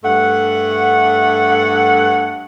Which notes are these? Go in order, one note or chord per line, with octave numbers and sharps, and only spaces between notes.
G2 A3 F#5